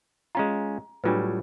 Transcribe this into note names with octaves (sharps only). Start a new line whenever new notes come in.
G#3 C#4 F4 A#5
A2 F#3 G3 D4 F4 B4